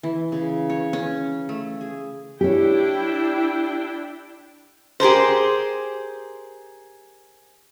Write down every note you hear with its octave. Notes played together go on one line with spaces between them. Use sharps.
E3
C#3
C#5
C#4
A3
G#4
D4 E4 G4 C#5 G5
G4 G#4 A#4 C5